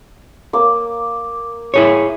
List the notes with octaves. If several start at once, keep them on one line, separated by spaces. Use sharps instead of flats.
A#3 D6
E4 G#4 C#5